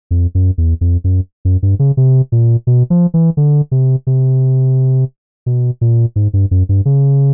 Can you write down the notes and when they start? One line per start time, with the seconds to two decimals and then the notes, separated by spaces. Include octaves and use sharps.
0.11 F2
0.35 F#2
0.58 E2
0.81 F2
1.04 F#2
1.45 F#2
1.63 G2
1.79 C#3
1.97 C3
2.32 A#2
2.67 B2
2.90 F3
3.14 E3
3.37 D3
3.71 C3
4.07 C3
5.46 B2
5.81 A#2
6.16 G#2
6.33 G2
6.51 F#2
6.69 G2
6.85 C#3